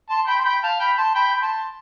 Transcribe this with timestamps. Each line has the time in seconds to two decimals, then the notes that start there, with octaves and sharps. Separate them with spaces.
0.09 A5 C6
0.27 G5 B5
0.39 C6
0.45 G5 B5
0.63 F5 A5
0.80 G5 B5
0.98 A5 C6
1.15 G5 B5
1.35 B5
1.41 A5 C6